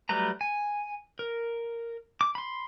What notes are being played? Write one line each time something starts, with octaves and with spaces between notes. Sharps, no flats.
F#3 G3 A3 B4 A#5
G#5
A#4
D6
B5 C6